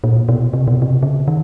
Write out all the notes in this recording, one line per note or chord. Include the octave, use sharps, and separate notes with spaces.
A#2
B2
C3
B2
C3
C#3
D#3